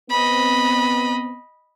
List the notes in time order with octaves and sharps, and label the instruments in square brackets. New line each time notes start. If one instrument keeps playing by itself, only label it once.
[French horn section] B3 C4 [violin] D#5 B5